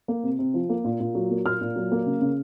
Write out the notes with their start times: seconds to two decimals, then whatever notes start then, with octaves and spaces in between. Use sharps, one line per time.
0.08 A#3
0.23 C3
0.39 C3
0.54 F3
0.69 A#3
0.84 A#2
1.00 A#2
1.15 F#3
1.30 A#3
1.45 A#2 F6
1.61 A#2
1.76 F#3
1.92 A#3
2.06 C#3
2.21 C#3